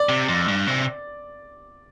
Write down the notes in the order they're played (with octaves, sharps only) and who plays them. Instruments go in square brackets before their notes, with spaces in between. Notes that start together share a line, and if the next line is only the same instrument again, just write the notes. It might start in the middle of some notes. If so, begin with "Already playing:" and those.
Already playing: [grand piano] D5
[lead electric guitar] C3
F2
G2
C3